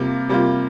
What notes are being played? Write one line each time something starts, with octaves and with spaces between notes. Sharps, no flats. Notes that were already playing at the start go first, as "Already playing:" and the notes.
Already playing: C3 G3 A#3 F4
C3 G3 A#3 F4